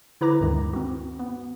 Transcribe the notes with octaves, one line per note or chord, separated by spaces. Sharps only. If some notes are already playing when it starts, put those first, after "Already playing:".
D3 E4 B4 A#5 D6 A#6
D2 G2 D#3 G#3
C4 F#4
B3